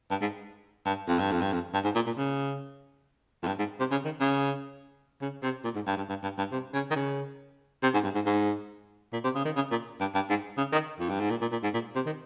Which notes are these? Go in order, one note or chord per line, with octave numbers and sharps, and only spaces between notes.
G2
G#2
G2
F2
G2
F2
G2
F2
G2
G#2
A#2
A#2
C#3
F2
G2
G#2
C3
C#3
D#3
C#3
C#3
C3
A#2
G#2
G2
G2
G2
G2
G2
C3
C#3
D#3
C#3
C3
G#2
G2
G#2
G#2
A#2
C3
C#3
D#3
C#3
A#2
G2
G2
G#2
C#3
D#3
F2
G2
G#2
A#2
A#2
A#2
G#2
A#2
C3
D#3